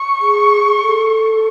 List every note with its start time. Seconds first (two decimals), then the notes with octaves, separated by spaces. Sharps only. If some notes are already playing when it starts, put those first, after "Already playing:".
Already playing: C#6
0.21 G#4
0.82 A4